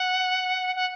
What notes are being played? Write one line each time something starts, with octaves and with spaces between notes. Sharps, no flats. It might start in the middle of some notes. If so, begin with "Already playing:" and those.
Already playing: F#5
F#5